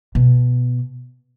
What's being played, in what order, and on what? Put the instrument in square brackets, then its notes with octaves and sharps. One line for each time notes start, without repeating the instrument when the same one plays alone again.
[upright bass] B2